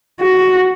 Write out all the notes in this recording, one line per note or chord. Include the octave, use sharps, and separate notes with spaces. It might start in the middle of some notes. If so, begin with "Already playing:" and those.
F#4